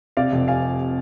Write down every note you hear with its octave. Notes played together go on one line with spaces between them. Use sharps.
C3 D5 F5
F1
F5 G#5